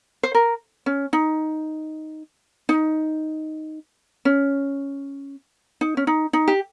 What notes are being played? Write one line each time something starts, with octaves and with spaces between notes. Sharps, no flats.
C5
A#4
C#4
D#4
D#4
C#4
D#4
C#4
D#4
D#4
G4